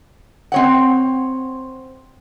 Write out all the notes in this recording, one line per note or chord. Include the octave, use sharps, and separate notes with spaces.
C4 C#5 F#5